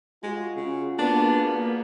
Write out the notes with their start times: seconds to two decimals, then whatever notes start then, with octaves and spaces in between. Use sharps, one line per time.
0.23 G#3 F4 F#4 G#4
0.56 C#3
0.99 A#3 B3 D4